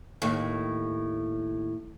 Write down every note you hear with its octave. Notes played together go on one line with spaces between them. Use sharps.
D#2 A2